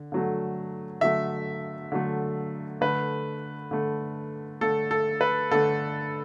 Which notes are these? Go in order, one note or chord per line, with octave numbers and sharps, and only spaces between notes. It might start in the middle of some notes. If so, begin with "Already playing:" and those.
Already playing: D3
D3 F#3 A3
D3 F#3 A3 E5
D3 F#3 A3
D3 A3 B4
D3 A3
D3 A3 A4
A4
B4
D3 A3 A4